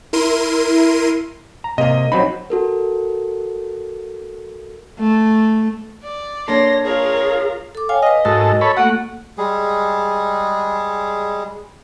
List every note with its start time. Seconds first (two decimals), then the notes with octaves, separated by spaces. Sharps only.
0.13 E4 A#4 C6 D#7
1.64 A#5
1.78 C3 A#3 D#5
2.12 F#3 C4 D#4 B5
2.50 F#4 A4 A#4
4.99 A3
6.03 D5
6.48 A#3 D4 A4 C#5 C6 A#6
6.85 F4 G#4 A#4 C#5
7.75 A4 D6
7.89 C#5 F5 G5 G#5
8.02 B4 D#5 F5
8.25 G#2 F#4 A4 A#4
8.61 A4 C#5 B5
8.77 A3 A#3 F#4 A4 F#5
9.38 G3 G#3 G#4